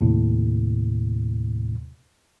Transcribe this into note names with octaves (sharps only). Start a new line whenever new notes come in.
D#2 A2 C3